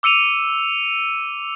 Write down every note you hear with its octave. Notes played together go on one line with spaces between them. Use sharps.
D6 E6 C#7 D#7 F7